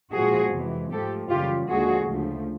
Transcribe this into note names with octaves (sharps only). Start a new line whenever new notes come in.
A#2 F3 G#3 F#4 G#4
F2 C3 E3 G#3
G#2 F3 A3 G4 A4
F#2 C#3 E3 G3 F4 G4
D#2 D3 F3 G#3 F#4 G#4
D2 C#3 F3 A3